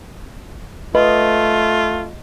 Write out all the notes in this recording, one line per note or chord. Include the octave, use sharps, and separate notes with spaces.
A3 F4 B4 D#5